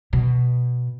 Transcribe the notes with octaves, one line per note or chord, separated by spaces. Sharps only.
B2